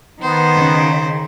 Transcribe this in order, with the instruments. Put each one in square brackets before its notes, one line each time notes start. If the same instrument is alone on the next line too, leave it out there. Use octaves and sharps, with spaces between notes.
[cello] D#3 [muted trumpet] B3 [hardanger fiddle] C5
[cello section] C#3